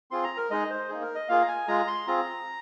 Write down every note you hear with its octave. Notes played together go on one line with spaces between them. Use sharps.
C4 F4 G#4 C6
A#5
A#4
G#3 D#4 G#4 D#5
C5
A#3 D#4 G#4
A#4
D#5
A#3 F4 G#4 F5
A#5
G#5
G#3 F4 G#4 A#5
C6
C4 F4 G#4 A#5